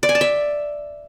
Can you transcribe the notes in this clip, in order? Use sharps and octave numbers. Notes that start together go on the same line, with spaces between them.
D5
G#5
A5
E5